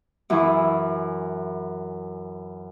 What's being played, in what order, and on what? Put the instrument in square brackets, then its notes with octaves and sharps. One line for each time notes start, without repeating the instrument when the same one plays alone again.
[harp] F#2 E3 E4 B5 C#6 E6